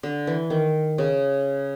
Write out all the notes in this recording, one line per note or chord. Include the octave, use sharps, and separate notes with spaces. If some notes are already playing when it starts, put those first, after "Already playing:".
D3
E3
D#3
C#3